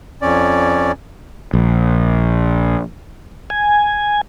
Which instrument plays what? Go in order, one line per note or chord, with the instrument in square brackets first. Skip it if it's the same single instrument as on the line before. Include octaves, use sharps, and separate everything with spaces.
[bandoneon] F2 C#4 D5
[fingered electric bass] A#1
[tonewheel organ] G#5